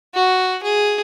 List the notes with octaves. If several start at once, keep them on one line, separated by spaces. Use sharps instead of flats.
F#4
G#4